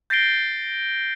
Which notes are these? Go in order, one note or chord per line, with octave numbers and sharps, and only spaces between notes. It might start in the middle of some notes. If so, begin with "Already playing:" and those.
G6 A6 A#6 C7 D7 G7